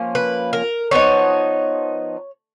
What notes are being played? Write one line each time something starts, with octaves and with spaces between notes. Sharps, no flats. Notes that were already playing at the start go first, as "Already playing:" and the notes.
Already playing: F3 A#3 C#4
B4
A#4
F3 B3 D#4 C#5